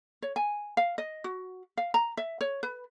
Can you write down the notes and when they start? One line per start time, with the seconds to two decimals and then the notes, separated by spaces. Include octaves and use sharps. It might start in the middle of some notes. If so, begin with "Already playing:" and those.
0.22 C#5
0.36 G#5
0.77 F5
0.98 D#5
1.24 F#4
1.77 F5
1.94 A#5
2.17 E5
2.41 C#5
2.63 B4